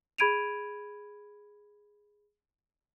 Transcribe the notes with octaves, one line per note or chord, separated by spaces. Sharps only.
G#4 B5 G#6 D7 D#7 F7